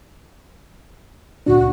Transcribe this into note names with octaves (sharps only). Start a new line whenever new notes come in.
D2 A#2 D4 F#4